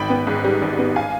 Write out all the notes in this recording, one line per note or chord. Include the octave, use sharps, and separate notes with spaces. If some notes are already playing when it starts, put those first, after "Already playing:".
Already playing: G#1 G5 B5
B3
G#2
G3
G#1
B3
F5 G#5